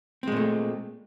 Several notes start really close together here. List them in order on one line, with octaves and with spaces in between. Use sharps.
C4 G#3 A#2 A3